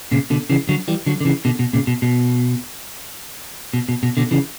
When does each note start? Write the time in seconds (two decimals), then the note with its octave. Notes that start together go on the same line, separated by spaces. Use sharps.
0.11 A#2 C#3
0.30 B2 D3
0.50 C#3 E3
0.69 D3 F#3
0.88 E3 G3
1.06 D3 F#3
1.21 D3
1.25 C#3 E3
1.45 B2 D3
1.59 B2
1.73 A#2 C#3
1.87 B2
2.02 B2
3.74 B2
3.89 B2
4.03 B2
4.17 B2 D3
4.31 C#3 E3